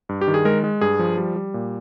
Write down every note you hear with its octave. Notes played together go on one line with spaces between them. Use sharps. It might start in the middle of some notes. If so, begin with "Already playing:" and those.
G2
G4
D#3
G#4
G#3 A#4
G#3
G2 G#4
F3
G3
G3
A#2